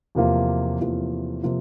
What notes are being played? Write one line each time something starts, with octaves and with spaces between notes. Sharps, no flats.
E2 C3 F3 A#3 F4
E2 C3 F3 A#3 F4
C3 F3 A#3 F4